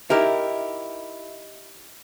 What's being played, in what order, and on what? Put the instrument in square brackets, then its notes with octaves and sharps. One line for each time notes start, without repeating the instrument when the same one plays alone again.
[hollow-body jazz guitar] D#4 G4 A#4 [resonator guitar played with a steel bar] E4